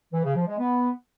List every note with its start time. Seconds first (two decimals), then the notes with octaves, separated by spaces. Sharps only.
0.13 E3
0.24 C#3
0.36 F3
0.47 G#3
0.59 B3